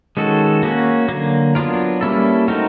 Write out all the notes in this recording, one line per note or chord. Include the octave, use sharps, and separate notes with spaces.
D#3 G#3 C#4 F#4 A4
A#3 C#4 F#4
D3 F#3 A#3
F#3 B3 D4 F4 A#4
G3 A#3 C#4 E4 A4
A3 C4 D#4 F#4 A#4